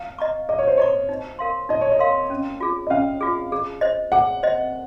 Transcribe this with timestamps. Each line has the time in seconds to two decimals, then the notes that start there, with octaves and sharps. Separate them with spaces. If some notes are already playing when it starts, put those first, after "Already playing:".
Already playing: F5
0.19 D#5 A#5 C#6
0.49 G#4 D#5
0.58 C#5
0.67 C5
0.77 C#5 D#5 A#5 C#6
1.09 D#4
1.39 A#4 F5 C6
1.69 D#4 D#5
1.81 C#5
1.92 D#5
1.99 A#4 F5 C6
2.30 C#4
2.61 F4 G#4
2.87 D#5
2.90 C#4 F5
3.21 F4 G#4
3.52 G#4
3.81 C5 D#5
4.12 G#4 F#5
4.43 C5 D#5